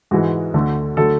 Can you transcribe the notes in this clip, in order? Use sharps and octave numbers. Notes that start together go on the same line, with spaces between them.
G#2 E3 G#3 F#4
D2 D3 A3
D3 F#3 A3 A4